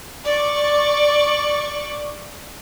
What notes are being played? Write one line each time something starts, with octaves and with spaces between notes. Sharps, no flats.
D5 C#6